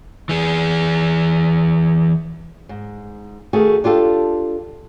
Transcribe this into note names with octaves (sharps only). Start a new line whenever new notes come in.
E3 G#4
G#2
D#3 A3 F#4 G#4
D4 F4 G4 A4